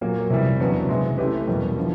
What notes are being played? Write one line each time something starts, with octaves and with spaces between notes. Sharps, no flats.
A#2 F#3 A#3
C3 E3 G3
E2 C#3 F#3 B3 D4
C3 E3 G#3
A3 C#4 E4 G4 B4
E2 B2 G3 A#3
D3 F3